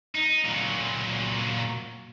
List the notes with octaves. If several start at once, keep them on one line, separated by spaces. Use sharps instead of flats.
D#4
A#2 F#3